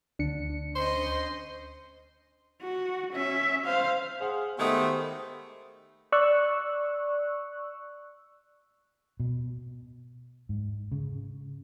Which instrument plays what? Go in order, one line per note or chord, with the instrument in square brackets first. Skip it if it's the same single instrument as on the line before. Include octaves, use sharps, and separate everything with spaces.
[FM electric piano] D2 C#7 [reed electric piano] D4
[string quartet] C#4 C5 D#5 [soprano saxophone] C6
[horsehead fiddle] F#4
C#4 E5
C5 F5
[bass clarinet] G#4 [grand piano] C5 F#5
[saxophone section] D#3 G#3 A3 [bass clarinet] B3 [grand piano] G4 D#6 [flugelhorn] C5
[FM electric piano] D5 C#6 E6 F#6
[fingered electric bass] B2
G#2
C#3